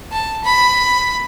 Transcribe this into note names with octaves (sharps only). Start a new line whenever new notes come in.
A5
B5